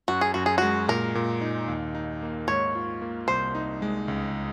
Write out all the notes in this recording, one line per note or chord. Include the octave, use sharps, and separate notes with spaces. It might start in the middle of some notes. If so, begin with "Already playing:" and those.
F#2 F#4
G#4
F#2 F#4
G#4
G#3 F#4
A#2 A#4
A#2
D#4
D#2
D#4
A#3
G#2 C#5
F4
A#3
C2 C5
D#4
G#3
C#2